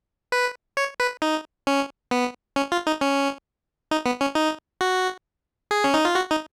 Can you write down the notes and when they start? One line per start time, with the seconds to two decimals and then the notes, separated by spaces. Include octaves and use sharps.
0.32 B4
0.77 C#5
1.00 B4
1.22 D#4
1.67 C#4
2.11 B3
2.56 C#4
2.72 F4
2.87 D#4
3.01 C#4
3.91 D#4
4.06 B3
4.21 C#4
4.35 D#4
4.81 F#4
5.71 G#4
5.84 C#4
5.94 D#4
6.05 F4
6.15 F#4
6.30 D#4